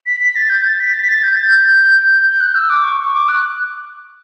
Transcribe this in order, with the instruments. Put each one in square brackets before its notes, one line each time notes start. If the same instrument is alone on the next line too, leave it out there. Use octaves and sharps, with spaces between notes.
[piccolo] B6
B6
A6
G6
A6
B6
A6
B6
A6
G6
A6
G6
G6
F#6
E6
D6
C#6
C#6
D6
F#6